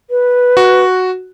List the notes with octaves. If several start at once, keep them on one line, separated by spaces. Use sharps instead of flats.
B4
F#4